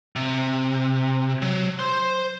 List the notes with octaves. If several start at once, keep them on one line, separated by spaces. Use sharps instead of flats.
C3
F#3
C5 C6